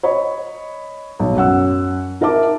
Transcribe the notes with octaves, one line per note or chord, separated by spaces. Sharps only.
C#5 D#5 B5
B1
F#2 F#5 E6
D#4 A#4 E5 A5 D6